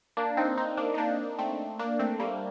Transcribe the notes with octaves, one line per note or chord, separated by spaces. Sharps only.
A#3 D4
C4 D#4
C4 D#4
A#3 D4
D#4
A#3 D4
A3 C4
A#3 D4
A3 C4
G3 A#3